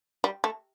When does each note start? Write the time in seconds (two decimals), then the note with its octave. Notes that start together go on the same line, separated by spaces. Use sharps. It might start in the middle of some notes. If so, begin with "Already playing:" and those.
0.24 G3
0.44 A3